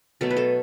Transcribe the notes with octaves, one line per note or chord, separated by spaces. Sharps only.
B2 F#3 A3 A4
B4
A4